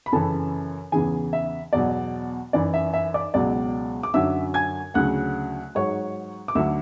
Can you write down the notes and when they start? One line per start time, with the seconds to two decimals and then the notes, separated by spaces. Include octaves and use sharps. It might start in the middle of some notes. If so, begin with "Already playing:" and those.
0.06 B5
0.12 F#2 C#3 E3 A4 A5
0.92 E2 C#3 E3 G#4 G#5
1.33 E5
1.73 E2 B2 F#3 D5
2.53 F#2 E3 D5
2.74 E5
2.93 E5
3.14 D5 D6
3.34 C#2 B2 F#3 D5 D6
4.03 D6
4.14 F#2 D3 F#3 E5 E6
4.54 G#5 G#6
4.94 D2 C#3 F#3 F#5 F#6
5.75 G#2 F#3 C#5 C#6
6.48 D6
6.55 D2 D3 F#3 E5 E6